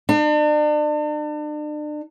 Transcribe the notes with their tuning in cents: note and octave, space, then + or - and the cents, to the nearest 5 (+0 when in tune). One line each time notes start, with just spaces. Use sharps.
D4 +35